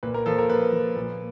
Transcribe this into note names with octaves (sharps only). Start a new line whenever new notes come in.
A#2 B4
A#4
F3 A4
A#4
A#2 B4
F3
A#2